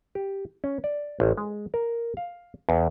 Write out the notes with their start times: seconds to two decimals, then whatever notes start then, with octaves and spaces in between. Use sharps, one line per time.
0.15 G4
0.64 C#4
0.84 D5
1.20 A1
1.37 G#3
1.74 A#4
2.17 F5
2.69 E2